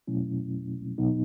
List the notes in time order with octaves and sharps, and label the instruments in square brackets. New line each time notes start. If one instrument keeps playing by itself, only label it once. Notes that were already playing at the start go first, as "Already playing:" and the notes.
[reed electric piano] B2 F#3 A3 C#4 E4
B2 F#3 B3 D#4